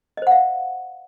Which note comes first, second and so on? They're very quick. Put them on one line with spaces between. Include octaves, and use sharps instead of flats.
D#5 C5 F#5 F5